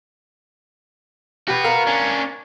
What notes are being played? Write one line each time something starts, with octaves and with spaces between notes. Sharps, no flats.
F#4 G4 B4
A#4 F5
C#4 D4